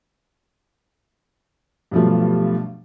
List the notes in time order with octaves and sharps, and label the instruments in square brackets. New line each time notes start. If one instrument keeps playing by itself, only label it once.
[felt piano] G2 B2 F3 F#3 A3